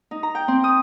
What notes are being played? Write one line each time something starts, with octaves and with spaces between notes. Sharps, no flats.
D#4
A#5
G5
C4
D#6